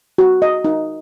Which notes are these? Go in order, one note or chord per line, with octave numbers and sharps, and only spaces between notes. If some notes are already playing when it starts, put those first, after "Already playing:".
F#4
D#5
D#4